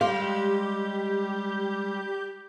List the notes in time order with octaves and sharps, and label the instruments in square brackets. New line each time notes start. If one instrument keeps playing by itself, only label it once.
[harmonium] G3 [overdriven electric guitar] G#3 C6 [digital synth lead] G4 [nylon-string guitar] F5